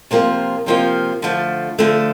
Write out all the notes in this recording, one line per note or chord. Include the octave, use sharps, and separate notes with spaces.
C3 F3 A#3 F4
C3 F3 A#3 F4
D3 F3 A3
D3 F3 A3